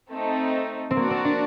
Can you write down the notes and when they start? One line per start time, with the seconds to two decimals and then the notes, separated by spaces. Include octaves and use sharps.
0.11 A3 C4 D#4 A4
0.91 C4
0.97 A#3 F#4 A#4 D5 A5
1.10 C4
1.25 D4